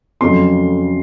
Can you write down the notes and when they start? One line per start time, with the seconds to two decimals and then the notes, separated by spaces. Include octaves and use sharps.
0.21 F2 C#3 F#3 A3 C6